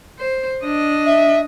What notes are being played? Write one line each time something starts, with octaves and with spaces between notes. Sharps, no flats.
C5
D4 D#5
E5